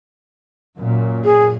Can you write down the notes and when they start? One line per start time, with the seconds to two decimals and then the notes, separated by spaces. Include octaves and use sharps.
0.77 F#2 A#2
1.24 G#4